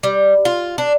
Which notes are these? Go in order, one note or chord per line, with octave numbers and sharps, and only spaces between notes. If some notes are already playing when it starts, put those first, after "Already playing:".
G3
F4
D4